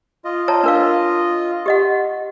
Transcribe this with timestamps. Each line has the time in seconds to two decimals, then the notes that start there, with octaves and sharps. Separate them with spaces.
0.25 F4 D#5
0.48 C#5 A5 A#5
0.64 D4 A#4 F5
1.66 G4 D#5 F#5